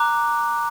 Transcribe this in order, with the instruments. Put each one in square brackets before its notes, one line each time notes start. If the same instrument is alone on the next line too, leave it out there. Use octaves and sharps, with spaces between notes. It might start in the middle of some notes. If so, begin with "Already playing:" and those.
Already playing: [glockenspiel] A#5 D6 F#6